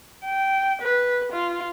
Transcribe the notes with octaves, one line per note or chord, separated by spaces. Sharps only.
G5
B4
F4